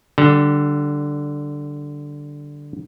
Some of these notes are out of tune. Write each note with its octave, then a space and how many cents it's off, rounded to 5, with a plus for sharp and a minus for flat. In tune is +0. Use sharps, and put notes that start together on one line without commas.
D3 +0 G3 -25